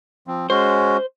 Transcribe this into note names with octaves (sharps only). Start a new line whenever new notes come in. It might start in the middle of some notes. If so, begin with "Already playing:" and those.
F3 C4
G#3 C#4 F#4 C5